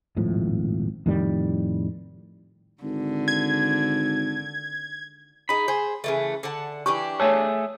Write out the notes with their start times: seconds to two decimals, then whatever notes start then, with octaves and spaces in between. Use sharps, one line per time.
0.17 D#1 G#1 A2 F3
1.06 F2 A2 D#3 G3
2.83 G#1 D3
3.28 G#6
5.49 D#4 G#4 B5
5.68 G#4 C5
6.04 C#3 E3 A3
6.43 D3 F#5 A5
6.86 E3 D4 G4 C#6
7.20 A3 G#4 A4 C#5